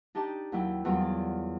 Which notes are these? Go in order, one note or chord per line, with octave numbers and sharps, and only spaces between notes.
D4 D#4 G4 A5
D#2 F#3 E4 G5 E6
E2 F#3 G3 F4 A#4
D5